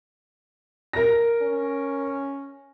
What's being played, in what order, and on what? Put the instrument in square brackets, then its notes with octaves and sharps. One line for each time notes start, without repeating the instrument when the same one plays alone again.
[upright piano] A#4 A#6
[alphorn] C#4